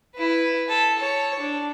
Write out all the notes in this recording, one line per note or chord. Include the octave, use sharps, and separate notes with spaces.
E4 B4
A4
A4 C#5
D4